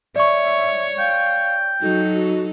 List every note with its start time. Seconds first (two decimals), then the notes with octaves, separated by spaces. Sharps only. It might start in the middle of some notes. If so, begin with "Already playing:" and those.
0.16 C#5 D5 E5 C#6
0.99 F5 G5
1.81 F#3 D#4 F#4 A4
2.13 F#4